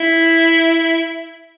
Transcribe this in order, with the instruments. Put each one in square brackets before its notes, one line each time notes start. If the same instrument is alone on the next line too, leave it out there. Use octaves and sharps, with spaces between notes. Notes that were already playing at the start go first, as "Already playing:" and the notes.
Already playing: [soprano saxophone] E4